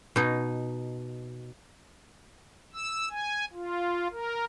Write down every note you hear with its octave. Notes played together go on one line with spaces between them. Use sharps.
B2 D#4
E6
G#5
F4
A#4